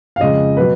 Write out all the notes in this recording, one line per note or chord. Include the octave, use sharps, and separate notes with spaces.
F5
F2 C#3 G#3 D#5
B2 F#3 B4